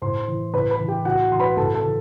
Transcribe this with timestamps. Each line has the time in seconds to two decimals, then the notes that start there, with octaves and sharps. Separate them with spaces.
0.02 A2 C5 C6
0.28 E3
0.54 A2 B4 B5
0.70 B4 B5
0.79 E3
0.88 G4 G5
1.05 A2 F#4 F#5
1.31 E3 C6
1.40 B4 B5
1.57 A2 A4 A5
1.74 A4 A5
1.83 E3